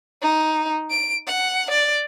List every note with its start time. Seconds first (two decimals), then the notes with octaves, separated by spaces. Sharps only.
0.21 D#4
0.90 D7
1.27 F#5
1.70 D5